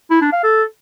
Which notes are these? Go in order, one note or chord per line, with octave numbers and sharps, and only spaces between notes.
E4
D4
F5
A4